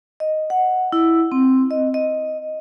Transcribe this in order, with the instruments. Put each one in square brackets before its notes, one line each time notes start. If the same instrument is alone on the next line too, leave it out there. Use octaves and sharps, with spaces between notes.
[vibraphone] D#5
F#5
E4
C4
D#5
D#5